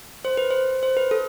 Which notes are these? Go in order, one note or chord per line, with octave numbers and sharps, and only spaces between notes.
C5
B4
C5
C5
B4
A4